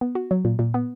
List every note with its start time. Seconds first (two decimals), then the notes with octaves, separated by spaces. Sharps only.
0.01 B3
0.15 F#4
0.31 F#3
0.45 A#2
0.59 A#2
0.74 B3